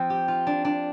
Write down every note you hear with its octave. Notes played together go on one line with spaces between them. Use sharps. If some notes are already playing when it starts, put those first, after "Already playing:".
Already playing: F3 C4 C5
G4
F4
D4
D4